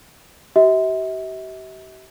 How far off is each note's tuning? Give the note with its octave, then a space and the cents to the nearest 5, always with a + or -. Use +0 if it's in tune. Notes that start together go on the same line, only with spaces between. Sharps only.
G4 -45 E5 -40